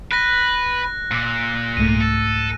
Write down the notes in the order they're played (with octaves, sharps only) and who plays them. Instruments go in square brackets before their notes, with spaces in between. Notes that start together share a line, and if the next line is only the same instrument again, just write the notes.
[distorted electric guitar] B4 [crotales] F#6 A#6
[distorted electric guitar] A#2 [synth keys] D6 E6
[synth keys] C2 G#2 A3 [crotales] D#7
[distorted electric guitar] A4